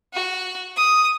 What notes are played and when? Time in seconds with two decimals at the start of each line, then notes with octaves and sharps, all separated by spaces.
0.14 F#4
0.77 D#6